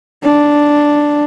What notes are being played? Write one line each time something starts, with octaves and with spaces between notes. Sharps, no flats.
D4